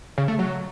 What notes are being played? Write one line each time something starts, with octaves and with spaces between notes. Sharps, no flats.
C#3
A3
F#3